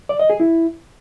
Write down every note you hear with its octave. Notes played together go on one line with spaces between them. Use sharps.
D5
D#5
G#4
E4